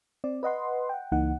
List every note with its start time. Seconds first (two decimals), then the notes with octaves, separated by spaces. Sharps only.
0.24 C4 D5
0.43 B4 D#5 F#5 C6
0.89 F#5 G5
1.12 C#2 E3 A#3 D#4 F#5